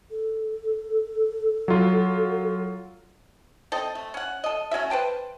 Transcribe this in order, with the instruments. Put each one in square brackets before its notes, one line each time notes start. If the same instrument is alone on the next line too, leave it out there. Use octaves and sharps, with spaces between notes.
[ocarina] A4
[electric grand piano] F#3 F4
[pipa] C4 A4 D#5
A3
C#4 F#5
A4 D#5
A3 C#4 F#4 E5
B4 C5 G5 A5